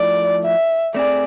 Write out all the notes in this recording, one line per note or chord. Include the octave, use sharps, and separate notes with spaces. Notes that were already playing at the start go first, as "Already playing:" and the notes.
Already playing: F3 A3 E4 D5
E5
A3 C4 G#4 D5